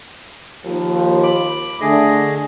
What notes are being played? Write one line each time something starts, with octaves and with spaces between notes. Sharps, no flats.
D#2 F3
B5 D6
D3 A3 D4 G#4 D#5